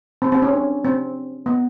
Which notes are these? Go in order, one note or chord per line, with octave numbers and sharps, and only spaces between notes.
C4
C4
C#4
D4
C4
B3